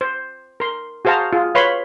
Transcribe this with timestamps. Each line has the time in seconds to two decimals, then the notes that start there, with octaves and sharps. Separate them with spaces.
0.01 C5
0.60 A#4 C6
1.05 F#4 G#4 C5 F5 A5 A#5
1.33 F4 G#4
1.55 B4 C#5 F5 B5 C6